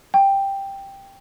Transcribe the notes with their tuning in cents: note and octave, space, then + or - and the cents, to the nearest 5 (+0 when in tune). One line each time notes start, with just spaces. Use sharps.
G5 +5